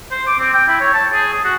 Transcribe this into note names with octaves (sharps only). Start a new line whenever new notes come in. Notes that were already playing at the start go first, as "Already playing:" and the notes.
C5
D6
C4
G5
E4
C#5
A5
G#4
G#4
F#4